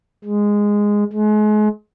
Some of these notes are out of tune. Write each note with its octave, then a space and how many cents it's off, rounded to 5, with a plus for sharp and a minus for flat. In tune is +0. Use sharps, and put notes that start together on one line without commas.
G#3 -10
G#3 +35